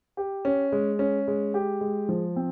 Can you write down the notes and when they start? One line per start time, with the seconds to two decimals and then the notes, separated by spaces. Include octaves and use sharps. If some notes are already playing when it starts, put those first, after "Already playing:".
0.17 G4
0.45 C#4
0.72 G#3
0.99 C#4
1.28 G#3
1.54 G4
1.81 G#3
2.09 F3
2.36 C4